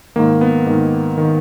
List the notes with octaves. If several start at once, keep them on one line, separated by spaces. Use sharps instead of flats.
G#2 D#3 A#3
B3
G#2 D#3
D#3